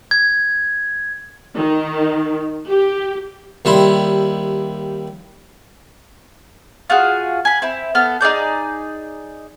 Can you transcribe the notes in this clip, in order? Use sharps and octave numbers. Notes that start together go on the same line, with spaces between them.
G#6
D#3
G4
D#2 G3 E4 C6
F4 F#4 G#4
G#5 B5
C4 E4
B3 A4 F6
D#4 G#4 D5 G6